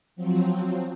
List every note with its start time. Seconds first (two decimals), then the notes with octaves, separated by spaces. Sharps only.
0.16 F3 F#3 C4